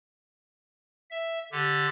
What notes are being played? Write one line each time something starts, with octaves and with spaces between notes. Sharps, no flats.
E5
D3 G4